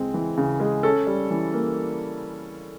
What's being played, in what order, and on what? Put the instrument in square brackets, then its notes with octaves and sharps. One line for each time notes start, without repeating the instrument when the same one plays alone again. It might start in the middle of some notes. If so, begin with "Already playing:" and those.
Already playing: [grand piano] C#3 E3 G#3 C4
E3
C#3
G#3
C#4 A4
G3
E3
A#3